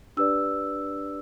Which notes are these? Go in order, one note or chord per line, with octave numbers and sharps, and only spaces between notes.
D4 G4 B4 D5 E6